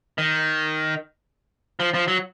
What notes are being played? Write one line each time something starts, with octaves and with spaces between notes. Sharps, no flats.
D#3
F3
F3
F#3